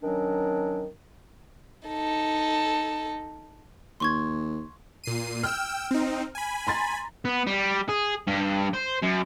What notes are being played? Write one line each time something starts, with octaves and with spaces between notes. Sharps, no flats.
D#3 F#3 C#4 D4
D#4 A4
D#2 C6 C#6 G#6
A#2 C7 D#7
G5 E6 F6
C4 D#4
G#5 B5
A#5 C6 A6
B3
G3
G#4
G2
C5
F#2